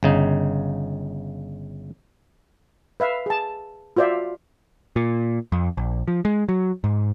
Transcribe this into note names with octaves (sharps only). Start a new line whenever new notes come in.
G1 C#3 D#4
B4 E5 F5
G#4 A5
F4 F#4 C5 D5 E5 F5
A#2
F2
A#1
F3
G#3
F#3
G#2